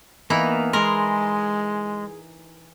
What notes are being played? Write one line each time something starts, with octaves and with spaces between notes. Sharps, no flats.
E3 A#3 B3 D#4 E4 F5
G#3 G#4 A#4 B5 C6